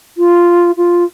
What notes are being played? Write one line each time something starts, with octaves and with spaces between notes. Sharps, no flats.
F4
F4